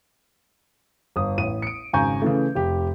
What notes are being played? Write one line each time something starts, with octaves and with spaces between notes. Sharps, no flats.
G1 D#6
A1 D#7
C#7 D7
G#1 C#3 G#5 A#5 C#6 G6
C#3 E3 A3
F1 G4